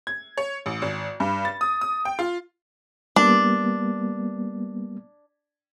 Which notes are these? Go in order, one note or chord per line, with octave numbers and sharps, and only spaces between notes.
G#6
C#5
A1
G#1
G2
A6
D#6
D#6
G5
F4
G3 A#3 B3 D4